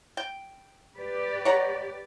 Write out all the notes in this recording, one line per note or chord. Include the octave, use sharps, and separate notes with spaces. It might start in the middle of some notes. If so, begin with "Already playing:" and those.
G5
G4 B4 D5
C#5 F#5 A#5